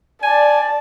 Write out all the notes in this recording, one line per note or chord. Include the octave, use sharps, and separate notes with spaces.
D5 G#5 A5